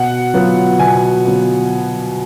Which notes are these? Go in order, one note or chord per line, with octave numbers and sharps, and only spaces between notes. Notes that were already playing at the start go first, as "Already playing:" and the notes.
Already playing: B2 F#5
F#3 B3 F4
B2 G#5
F#3 B3 F4